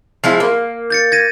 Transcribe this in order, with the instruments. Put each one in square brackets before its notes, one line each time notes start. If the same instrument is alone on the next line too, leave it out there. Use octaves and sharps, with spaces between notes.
[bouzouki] F3 G#3 E4
A#3
[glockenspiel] G6 A6 C#7
G#6 A#6 D#7